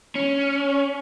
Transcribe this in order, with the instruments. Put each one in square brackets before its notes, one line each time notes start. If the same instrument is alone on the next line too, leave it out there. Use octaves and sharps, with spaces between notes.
[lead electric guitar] C#4